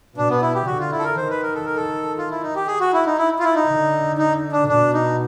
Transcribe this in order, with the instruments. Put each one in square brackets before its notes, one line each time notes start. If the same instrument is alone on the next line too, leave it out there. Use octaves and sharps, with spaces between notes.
[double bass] B2 [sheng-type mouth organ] D4
[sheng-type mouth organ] B3
E4
G4
[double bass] D3 [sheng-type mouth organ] F#4
[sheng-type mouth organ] F4
E4
A4
A#4
[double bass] D#3 [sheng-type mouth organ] C5
[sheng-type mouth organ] B4
A#4
A4
A#4
A4
F4
E4
D#4
G4
G#4
F#4
E4
D#4
E4
F4
E4
D#4
[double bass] D3
[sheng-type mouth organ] D#4
D4
[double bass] B2 [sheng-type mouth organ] D4
[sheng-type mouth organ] D#4